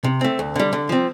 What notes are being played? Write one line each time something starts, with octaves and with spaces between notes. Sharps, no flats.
C3
A3 C4
D2
D3 G3
D3
F3 C4